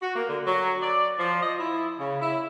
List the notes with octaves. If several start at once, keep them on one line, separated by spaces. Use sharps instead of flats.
F#4
A#3
D3
F#3
D5
F3
D#5
E4
C#3
E4